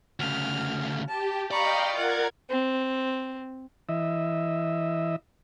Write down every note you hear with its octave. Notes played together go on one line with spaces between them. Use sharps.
D2 C#3 F6
G4 A5
D5 D#5 F5 G5 A#5 B5 C#6
F4 A#4 F#5 G#6
C4
E3 D#5 E5